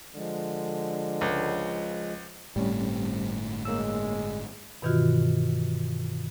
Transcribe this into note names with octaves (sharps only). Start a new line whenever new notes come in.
D3 F3 G#3
C#2
G1 A2 G3 A3 C4 C#4
G#3 A#3 C#5 E6
G2 B2 D#3 E3 F4 F#4